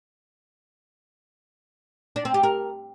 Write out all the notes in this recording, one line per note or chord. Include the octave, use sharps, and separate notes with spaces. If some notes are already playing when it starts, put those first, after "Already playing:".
D4
C4
G4
A#4